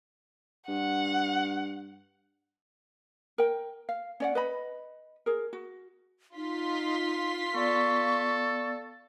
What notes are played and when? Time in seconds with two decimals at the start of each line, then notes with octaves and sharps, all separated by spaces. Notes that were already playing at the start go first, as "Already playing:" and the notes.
0.68 G2 F#5
3.38 A#4 G5
3.89 F5
4.20 C#4 D5 F#5
4.35 B4 D#5 B5
5.26 G#4 A#4
5.53 F#4
6.36 D#4 F4 C6 B6
7.54 B3 A4 D5 F5 C#6